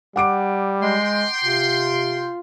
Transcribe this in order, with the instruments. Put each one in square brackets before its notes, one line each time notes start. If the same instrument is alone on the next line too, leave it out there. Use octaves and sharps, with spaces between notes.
[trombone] G3 [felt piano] F#5 D6 D7
[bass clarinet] G#3 [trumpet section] G5 C6
[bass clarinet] C3 [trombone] F4